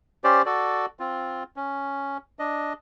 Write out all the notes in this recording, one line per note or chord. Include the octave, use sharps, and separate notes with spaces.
C#4 G4 C5 D5
F#4 A4 D5
C4 F4
C#4
D4 D#5